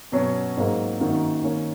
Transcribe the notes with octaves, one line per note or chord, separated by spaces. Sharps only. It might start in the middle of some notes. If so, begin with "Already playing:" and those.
B2 F#3 C#4
G#2 F#3 A#3
F#2 D#3 A#3 D#4 F#4
D#3 A#3 C#4